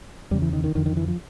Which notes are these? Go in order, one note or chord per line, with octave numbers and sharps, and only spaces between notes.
E2 C#3 G3
E3
D#3
D#3
F2 D3 D#3
D#3
E3
F3